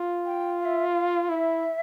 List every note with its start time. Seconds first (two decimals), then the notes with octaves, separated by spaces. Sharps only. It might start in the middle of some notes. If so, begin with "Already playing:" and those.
Already playing: F4
0.25 G5
0.60 F5
0.64 E5
0.94 F5
1.29 E4 E5